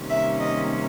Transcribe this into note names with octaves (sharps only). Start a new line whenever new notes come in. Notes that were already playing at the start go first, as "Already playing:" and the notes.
Already playing: C3 D#3 G3 A#3 C#4
E5
D#5